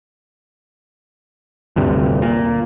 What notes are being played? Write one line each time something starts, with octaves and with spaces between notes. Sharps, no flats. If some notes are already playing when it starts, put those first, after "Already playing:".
G1 D2 G2 C3
A#2